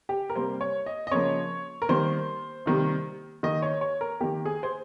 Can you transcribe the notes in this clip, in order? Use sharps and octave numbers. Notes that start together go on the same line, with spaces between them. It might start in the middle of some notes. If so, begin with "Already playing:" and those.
G4
A#4
C3 G3 A#3 C5
C#5
D#5
D#5
C#3 F3 A#3 C#5
A#4
D#3 G3 A#3 C5
C3 D#3 G3 A#3
D#3 A#3 D#5
C#5
C#5
A#4
D#3 A#3 G4
G#4
C5